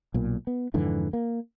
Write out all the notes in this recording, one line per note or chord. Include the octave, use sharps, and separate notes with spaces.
B1 A#2
B3
F2 G#2 D3 E3
A#3